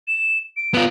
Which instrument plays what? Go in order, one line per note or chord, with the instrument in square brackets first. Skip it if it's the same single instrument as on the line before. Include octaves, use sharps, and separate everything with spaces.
[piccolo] E7
D7
[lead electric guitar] B3 F4